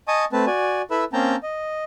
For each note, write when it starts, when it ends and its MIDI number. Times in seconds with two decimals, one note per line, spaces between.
0.08 0.25 75
0.08 0.25 80
0.08 0.25 81
0.08 0.25 85
0.08 0.25 87
0.33 0.45 57
0.33 0.45 60
0.33 0.45 71
0.33 0.45 81
0.47 0.82 66
0.47 0.82 74
0.47 0.82 80
0.91 1.04 64
0.91 1.04 69
0.91 1.04 71
0.91 1.04 76
0.91 1.04 83
0.91 1.04 88
1.13 1.36 58
1.13 1.36 60
1.13 1.36 61
1.13 1.36 79
1.13 1.36 81
1.13 1.36 82
1.43 1.84 75